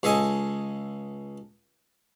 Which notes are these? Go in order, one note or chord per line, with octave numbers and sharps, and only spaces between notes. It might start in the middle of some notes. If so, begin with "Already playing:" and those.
C#2 G#4 A4 D#5 G#5